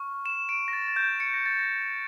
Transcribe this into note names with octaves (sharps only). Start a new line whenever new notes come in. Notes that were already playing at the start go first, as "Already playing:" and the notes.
Already playing: C#6 F6
E7
D7
A#6
A6
A6
G6
C#7
A#6
A6
A#6